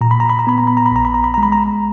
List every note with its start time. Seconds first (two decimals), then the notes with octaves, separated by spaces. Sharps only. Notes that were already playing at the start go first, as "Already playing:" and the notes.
0.01 A#2 A#5
0.11 B5
0.20 A#5
0.30 B5
0.39 A#5
0.47 B3 B5
0.58 A#5
0.67 B5
0.77 A#5
0.86 B5
0.92 A#1 A#5
1.05 B5
1.14 A#5
1.24 B5
1.34 G#3 A#5
1.43 B5
1.52 A#5